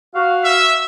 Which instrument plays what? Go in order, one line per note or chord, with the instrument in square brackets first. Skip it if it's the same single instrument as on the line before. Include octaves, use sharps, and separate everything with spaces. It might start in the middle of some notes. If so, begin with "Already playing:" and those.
[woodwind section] F#4 F5
[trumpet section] E5